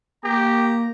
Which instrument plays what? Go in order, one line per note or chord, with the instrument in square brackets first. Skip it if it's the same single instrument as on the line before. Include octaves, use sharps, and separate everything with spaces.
[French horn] A#3 [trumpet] G4 [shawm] A#5